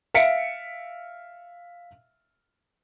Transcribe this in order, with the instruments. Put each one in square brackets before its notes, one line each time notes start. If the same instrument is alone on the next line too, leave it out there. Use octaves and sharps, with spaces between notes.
[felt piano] E5 F5 B6 C#7 D7